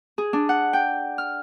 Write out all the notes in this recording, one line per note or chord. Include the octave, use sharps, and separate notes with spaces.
G#4
D4
F#5
G5
F6